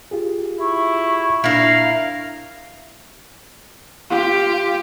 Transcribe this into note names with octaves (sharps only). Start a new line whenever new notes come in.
F4 G4 G#4
E4 C#6
A#2 D4 E4 A#4 F5 G6 A#6
F4 G4